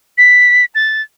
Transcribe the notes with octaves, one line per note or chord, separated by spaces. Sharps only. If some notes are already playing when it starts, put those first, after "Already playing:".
B6
A6